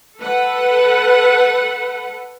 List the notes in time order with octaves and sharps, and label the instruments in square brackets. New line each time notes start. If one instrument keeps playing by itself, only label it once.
[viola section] A4 B4 F#5